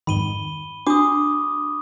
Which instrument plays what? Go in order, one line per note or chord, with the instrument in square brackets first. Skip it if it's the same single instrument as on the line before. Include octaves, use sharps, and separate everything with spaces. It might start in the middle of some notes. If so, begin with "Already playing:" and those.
[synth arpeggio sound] F2 G#2 D#3 [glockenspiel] B5 D#7 G7
[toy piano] D4 F#4 [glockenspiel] D6 D#6